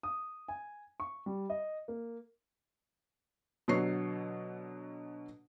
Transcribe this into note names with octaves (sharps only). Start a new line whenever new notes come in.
D#6
G#5
C#6
G3
D#5
A#3
B2 D3 F#3 C#5 C#6 C7